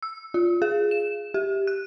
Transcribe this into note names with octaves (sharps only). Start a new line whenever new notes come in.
E6
F4
G#4
E7
G4
F#6